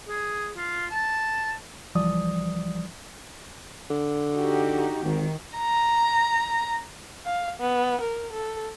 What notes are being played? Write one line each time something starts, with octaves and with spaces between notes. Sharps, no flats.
G#4
F4
A5
C2 E3 F3 G3 D5 D#6
D3
D#4 F#4 G4
G#1 D#3
A#5
F5
B3
A#4
A4